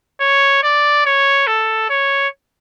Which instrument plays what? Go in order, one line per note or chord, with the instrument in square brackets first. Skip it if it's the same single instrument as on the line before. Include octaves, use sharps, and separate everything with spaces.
[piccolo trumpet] C#5
D5
C#5
A4
C#5